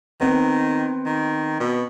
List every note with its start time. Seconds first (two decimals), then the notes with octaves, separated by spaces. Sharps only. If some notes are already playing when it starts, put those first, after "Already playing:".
0.21 D#3 B3 C4
1.06 D#3
1.60 B2